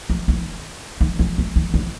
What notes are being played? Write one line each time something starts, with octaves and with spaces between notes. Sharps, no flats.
E3
D#3
D#3
E3
E3
D#3
D3